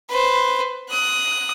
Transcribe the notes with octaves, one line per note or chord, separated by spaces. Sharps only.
B4 C5
D#6 F#6